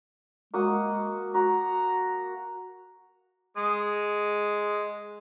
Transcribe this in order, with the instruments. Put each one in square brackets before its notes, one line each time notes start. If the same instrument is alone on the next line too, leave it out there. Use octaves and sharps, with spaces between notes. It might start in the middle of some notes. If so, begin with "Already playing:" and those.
[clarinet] G#3 [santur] A#3 F#4 D#6
[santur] F#4 [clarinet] A#5
[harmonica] G#3 D#6